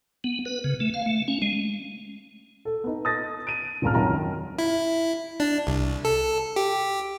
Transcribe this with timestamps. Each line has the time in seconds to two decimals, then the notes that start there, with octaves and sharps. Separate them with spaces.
0.24 B3
0.45 B4
0.64 C#3
0.80 A3
0.94 F5
1.06 A3
1.28 C#4
1.42 G#3
2.65 A4
2.84 B3 D#4
3.05 D#6 A6 A#6
3.47 D7 D#7
3.82 D#1 G#1 C#2 A5 A#5 F6
3.95 C2 F#2 D#3 A#5
4.59 E4
5.40 D4
5.67 C2
6.05 A4
6.56 G4